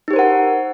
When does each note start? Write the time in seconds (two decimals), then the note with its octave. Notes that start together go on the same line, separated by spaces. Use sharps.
0.08 D#4
0.11 G4
0.13 C5
0.16 A#4
0.19 F#5